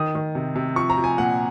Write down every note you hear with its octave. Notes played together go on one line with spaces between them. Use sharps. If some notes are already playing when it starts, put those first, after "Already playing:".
Already playing: D#3 D#6
D#3
C3
C3
F3 C#6
A#5
F3
G#5
A#2 F#5